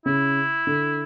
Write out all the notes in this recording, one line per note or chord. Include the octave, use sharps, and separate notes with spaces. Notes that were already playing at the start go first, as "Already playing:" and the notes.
C#3 E4
D3